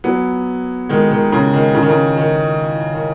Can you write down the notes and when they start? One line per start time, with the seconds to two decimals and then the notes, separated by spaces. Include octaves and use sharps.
0.04 F#3 B3
0.89 D#3 G#3
1.11 D#3
1.32 C#3
1.53 D#3
1.75 C#3
1.83 D#3
1.89 C#3
2.17 D#3
2.94 D#3